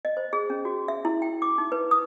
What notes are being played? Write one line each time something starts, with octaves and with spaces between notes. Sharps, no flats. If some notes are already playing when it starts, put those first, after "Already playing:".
D#5
C5
G#4
C#4
F#4
E5
E4
G5
D6
D#4
B4
D#6